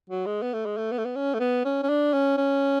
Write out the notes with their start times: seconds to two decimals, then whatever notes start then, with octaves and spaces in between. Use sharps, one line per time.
0.10 F#3
0.26 G#3
0.42 B3
0.54 A3
0.66 G#3
0.78 A3
0.92 B3
0.98 A3
1.05 B3
1.16 C#4
1.34 A3
1.40 B3
1.65 C#4
1.83 C#4
1.89 D4
2.13 C#4
2.38 C#4